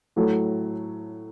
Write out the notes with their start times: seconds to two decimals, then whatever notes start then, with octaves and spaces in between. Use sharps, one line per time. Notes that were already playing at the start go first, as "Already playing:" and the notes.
0.16 A2 F#3 A3